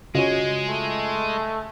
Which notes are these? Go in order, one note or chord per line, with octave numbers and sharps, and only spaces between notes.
C#3 G#3 F4 F#4 C#5 D#5
A3